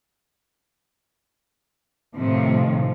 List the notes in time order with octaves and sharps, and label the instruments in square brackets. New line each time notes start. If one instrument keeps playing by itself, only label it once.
[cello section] A2 C3 D#3 F3